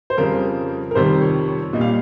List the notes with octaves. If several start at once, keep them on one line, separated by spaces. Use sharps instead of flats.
C5
F2 C#3 G3 A#4
A#4
F2 C3 D#3 G3 C5
C#5
C#5
A#2 G3 D#5
F5